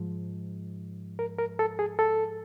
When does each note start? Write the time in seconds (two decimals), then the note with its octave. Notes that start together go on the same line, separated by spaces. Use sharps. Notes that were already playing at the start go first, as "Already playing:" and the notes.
Already playing: G#2 F3 G#3
1.19 A#4
1.38 A#4
1.59 A4
1.79 G#4
1.99 A4